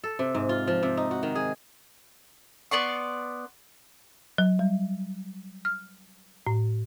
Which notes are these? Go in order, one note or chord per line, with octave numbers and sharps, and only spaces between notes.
A4
C3
G#2
F4
F3
C3
D#4
F#4
D#3
G#4
B3 D5 C6 C#6
F#3
G3
F6
A2